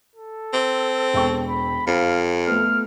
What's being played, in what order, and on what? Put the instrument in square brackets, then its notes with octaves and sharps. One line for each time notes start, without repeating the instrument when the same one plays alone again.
[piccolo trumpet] A4
[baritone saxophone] C4
[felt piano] E1 G5 C#6
[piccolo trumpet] B5
[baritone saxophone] F2 [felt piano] C5 [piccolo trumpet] F5
[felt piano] A3 B3 [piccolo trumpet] F6